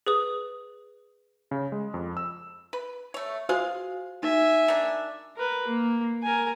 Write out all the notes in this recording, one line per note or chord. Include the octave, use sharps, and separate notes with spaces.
G#4 B4 D#6
C#3
G#3
F2
E6
B4
A3 C#5
F4 F#4 G#4 C5 F5
D#4 E5 G#5
D#3 D4
A#4 B4
A#3
A#4 G#5